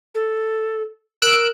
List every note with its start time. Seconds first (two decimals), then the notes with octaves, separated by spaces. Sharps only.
0.15 A4
1.22 A#4 E6 F#6 D7